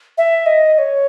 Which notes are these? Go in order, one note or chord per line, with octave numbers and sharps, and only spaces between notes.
E5
D#5
D#5
C#5